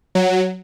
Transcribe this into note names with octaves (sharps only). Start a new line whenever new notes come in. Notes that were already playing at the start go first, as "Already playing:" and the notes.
F#3